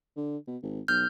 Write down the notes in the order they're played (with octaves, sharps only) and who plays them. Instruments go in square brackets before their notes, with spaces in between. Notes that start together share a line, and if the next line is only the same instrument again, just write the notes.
[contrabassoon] D3
B2
G#1
[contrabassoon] B1 [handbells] F6 G6